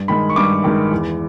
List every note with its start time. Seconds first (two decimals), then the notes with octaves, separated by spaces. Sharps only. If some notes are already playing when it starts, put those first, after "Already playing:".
Already playing: G2
0.08 D#3 G#3 B5
0.29 C#6
0.36 G2 D6
0.64 D#3 G#3
0.91 E2